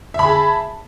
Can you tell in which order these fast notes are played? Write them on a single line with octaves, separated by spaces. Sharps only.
E5 B5 G#4 A5